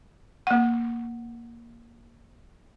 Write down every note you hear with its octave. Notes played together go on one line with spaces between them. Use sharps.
A#3 F#5